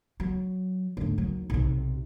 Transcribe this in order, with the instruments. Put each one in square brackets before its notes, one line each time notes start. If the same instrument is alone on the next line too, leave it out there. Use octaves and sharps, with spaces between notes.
[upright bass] F#3
D2 G#2
D#2 F#3
B1 C3